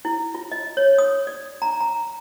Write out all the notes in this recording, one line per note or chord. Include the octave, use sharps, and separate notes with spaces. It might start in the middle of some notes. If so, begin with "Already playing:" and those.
E4
F4
D#5
C#5
D#6
D5
A#5
A#5